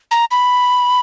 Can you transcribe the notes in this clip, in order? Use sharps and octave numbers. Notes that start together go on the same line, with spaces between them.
A#5
B5